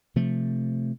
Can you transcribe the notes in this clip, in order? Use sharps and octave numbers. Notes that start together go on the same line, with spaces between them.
C3 F3 A3